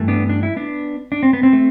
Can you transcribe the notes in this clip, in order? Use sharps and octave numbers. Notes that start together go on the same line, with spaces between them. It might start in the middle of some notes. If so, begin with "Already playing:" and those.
Already playing: G2 E3 A3
B3 D4
D4
E4
B3 D4
D4
C4
B3
C4
A3